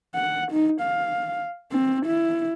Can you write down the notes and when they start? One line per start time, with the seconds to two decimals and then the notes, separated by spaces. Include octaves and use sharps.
0.15 F#5
0.52 D#4
0.82 F5
1.72 C4
2.07 E4